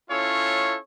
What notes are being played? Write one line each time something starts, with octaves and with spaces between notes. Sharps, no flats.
C#4 E4 F4 A4 C#5